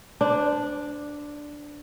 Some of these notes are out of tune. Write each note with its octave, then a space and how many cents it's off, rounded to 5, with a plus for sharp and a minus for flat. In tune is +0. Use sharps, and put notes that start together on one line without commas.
D4 +0 C5 -30